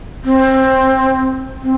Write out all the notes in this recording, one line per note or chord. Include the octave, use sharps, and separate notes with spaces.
C4
C4